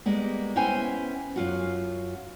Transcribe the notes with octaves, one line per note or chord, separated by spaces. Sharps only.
G3 G#3 A#3 B3
B3 C#4 E4 C5 G5 G#5
F#2 F4 F#4